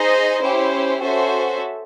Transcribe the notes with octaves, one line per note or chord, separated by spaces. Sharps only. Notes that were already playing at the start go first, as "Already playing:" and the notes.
Already playing: D#4 G#4 C5 D#5
C#4 E4 G4 C5
C#4 F#4 A4 C5 E5